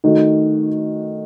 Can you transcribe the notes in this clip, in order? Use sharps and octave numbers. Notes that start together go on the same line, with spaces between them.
D#3 A3 D#4 F#4